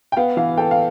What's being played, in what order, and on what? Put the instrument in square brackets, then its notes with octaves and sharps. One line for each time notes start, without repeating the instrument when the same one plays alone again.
[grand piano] G5
[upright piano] B3 [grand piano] F5
[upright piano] E3 [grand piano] F5
[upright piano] A4 [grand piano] G5
[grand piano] F5